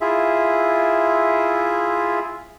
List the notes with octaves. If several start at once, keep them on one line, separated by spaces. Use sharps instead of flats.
E4 F4 G#4 E5